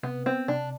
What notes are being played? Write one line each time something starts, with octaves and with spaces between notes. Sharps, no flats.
C3 B3
B3 C4
C3 D4